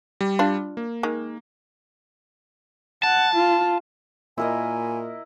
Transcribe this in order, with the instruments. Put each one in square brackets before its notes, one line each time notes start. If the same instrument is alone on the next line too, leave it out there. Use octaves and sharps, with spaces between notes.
[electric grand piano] G3
[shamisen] D4 F4
[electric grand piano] A#3
[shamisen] D#3 G#3
[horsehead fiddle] F#5 [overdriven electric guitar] A5
[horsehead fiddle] F4
[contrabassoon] A#2 [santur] E4 A#4 D#5 [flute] G#5